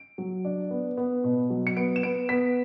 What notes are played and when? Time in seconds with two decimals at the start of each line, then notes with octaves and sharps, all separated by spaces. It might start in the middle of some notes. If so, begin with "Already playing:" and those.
Already playing: D7
0.18 F#3
0.45 D4
0.71 B3
0.97 B3
1.24 B2
1.50 F#3
1.67 C#7
1.77 B3 D7
1.96 E7
2.03 B3 D7
2.29 B3 B6